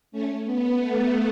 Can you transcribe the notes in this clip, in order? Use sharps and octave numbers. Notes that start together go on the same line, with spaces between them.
A3 C#4
B3
A3